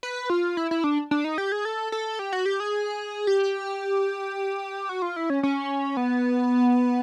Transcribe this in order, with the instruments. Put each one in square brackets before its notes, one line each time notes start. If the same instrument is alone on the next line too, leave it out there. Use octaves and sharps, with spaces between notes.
[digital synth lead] B4
F4
E4
E4
D4
D4
D#4
G4
G#4
A4
A4
G4
F#4
G4
G#4
G4
F#4
F4
E4
C#4
C#4
B3